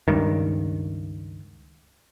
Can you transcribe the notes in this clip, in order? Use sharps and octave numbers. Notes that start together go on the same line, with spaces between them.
C#2 G2 D#3